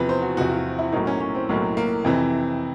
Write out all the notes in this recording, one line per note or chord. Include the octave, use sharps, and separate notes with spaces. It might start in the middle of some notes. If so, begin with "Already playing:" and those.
Already playing: E2 C3 F3 B4
C5
F#4
E2 C3 F3 F#4
F4
E4
B1 A2 F#3 A#3 D#4
C#4
C#4
C4
B1 A2 F#3 A#3
A#3
F2 C3 E3